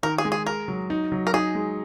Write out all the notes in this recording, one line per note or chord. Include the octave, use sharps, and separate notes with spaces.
D#3 A#4
G#4
G#3
G#4
G#4 A#4
F#3
D#4
F#3
A#4
D#4 G#4
G#3